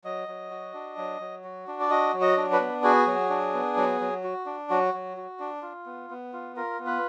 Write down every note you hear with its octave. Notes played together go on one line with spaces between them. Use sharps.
F#3 D#5
F#3
F#4
D4
F#3
F#3
F#4
D4
D5
F#4 D#5
F#3
D#5
D4
B4
B3
F#4 G#4
F#3
D4
B3
F#3
F#3
F#4
D4
F#3 F#4
F#3
F#4
D4
F4
B3
B3
F4
F4 A#4
B3
B4